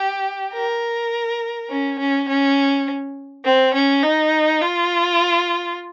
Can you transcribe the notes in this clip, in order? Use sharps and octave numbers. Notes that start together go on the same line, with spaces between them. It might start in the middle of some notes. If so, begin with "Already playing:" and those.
Already playing: G4
A#4
C#4
C#4
C#4
C4
C#4
D#4
F4